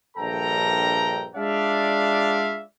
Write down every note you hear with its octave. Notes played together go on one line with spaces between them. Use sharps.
A#1 G2 A4 G5 A#5
G#3 D4 F4 D5 E5 F5